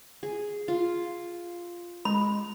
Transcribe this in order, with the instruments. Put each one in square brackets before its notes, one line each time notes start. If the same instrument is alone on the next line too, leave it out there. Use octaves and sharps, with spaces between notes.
[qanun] G#4
F4
[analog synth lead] G#3 [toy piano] B5